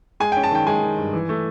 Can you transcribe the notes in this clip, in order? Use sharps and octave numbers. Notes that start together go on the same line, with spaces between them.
G#3 G#5
G5
C#4
A5
D#3 G5
G#3 G#5
D#3
G2
E3
A3